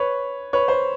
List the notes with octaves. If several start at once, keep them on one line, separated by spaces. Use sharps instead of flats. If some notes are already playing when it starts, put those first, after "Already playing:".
Already playing: B4 C#5
B4 C#5
C5